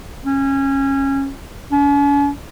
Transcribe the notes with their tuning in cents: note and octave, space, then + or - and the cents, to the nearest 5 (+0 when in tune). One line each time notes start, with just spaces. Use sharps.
C#4 -20
C#4 +45